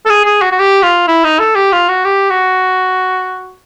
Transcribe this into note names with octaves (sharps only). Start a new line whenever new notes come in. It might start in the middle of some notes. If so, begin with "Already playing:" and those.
A4
G#4
G#4
F#4
F#4
G4
F4
E4
D#4
A4
G4
F4
F#4
G4
F#4